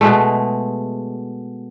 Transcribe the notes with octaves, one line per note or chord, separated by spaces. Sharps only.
B2 G#3 A3